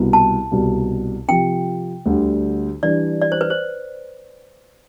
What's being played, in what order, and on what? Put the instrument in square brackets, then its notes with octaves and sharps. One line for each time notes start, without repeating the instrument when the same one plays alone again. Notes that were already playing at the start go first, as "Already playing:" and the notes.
Already playing: [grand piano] C2 B2 B3 E4
[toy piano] A5
[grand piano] C2 B2 G3
[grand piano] C3 F3 C4 [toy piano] G5
[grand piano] D2 D3 G3 D4
[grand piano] E3 G3 D4 [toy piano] D5
[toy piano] D5
C5
B4
C5